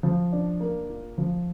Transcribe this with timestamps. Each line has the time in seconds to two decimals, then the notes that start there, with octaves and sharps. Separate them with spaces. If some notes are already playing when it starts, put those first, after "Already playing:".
0.03 F3
0.32 D4
0.60 A#3
0.90 F4
1.18 F3